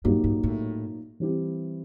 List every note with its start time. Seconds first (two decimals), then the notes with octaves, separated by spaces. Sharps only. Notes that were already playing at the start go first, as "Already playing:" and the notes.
0.05 G2 A#2 F#3 A#3 D#4 G4
0.24 G#2
0.43 A2
1.20 E3 G3 C4 E4 G4